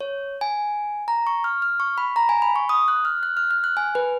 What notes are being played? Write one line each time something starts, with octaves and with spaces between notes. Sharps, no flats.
C#5
G#5
A#5
C#6
F6
F6
C#6
B5
A#5
G#5
B5
C#6
D#6
F#6
F6
F#6
F6
F6
F#6
G#5
B4